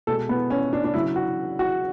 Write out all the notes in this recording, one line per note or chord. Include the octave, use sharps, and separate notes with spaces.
B2 G#3 A4
B3
C#4
D4
D4
C#3 F#3 E4
F#4
F#4